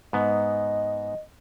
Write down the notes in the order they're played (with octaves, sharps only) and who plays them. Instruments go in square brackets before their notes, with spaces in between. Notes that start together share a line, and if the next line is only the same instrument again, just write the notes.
[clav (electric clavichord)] G#2 B3 [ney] D#5